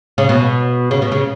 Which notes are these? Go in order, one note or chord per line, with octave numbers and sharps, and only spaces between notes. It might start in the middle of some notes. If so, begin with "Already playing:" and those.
C#3
B2
C#3
B2
C#3